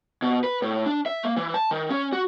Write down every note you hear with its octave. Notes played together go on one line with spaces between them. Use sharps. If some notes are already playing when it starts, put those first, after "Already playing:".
B2
B4
A2
D4
E5
A#3
E3
A5
D#3
C#4
F#4